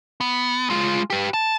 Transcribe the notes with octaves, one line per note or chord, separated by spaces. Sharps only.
B3
G#3 F4
G4 B4
A5